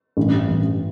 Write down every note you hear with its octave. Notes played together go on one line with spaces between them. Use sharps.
A1 G2 E3
A1 G2 E3